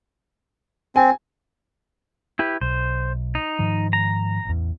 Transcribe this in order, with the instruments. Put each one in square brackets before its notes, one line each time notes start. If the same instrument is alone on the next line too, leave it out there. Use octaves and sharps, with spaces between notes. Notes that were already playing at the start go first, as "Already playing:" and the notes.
[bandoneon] C4 [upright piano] G#5
[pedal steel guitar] E4 G4 B4
[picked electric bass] B1 [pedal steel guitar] C5
[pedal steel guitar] D#4
[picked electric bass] G#2 D#3 F3
[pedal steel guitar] A#5
[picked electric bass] A1 E2